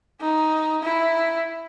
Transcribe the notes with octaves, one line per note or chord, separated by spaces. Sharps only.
D#4
E4